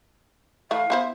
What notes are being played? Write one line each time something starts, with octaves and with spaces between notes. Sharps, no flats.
E3 A3 E4 F5
B3 E4 C5